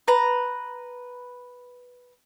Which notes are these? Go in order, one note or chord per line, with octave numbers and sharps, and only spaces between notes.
B4 A#5